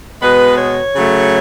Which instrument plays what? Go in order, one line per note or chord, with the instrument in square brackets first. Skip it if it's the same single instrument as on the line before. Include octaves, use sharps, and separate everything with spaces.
[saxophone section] B2 G#3 B3 B4
C#5
C#3 F#3 A3